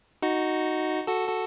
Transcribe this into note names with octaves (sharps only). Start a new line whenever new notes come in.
D#4 F#4
F#4 A4
F#4 A4